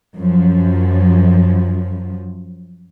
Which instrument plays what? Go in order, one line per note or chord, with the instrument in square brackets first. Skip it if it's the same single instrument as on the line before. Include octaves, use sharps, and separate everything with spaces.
[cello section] F#2 F3